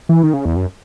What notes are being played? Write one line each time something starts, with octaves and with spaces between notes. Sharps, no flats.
E3
D#3
C#3
E2
F#2